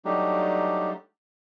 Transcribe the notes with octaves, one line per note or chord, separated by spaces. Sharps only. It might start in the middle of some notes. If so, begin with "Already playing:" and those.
F#3 G3 A3 D4 D#4 G4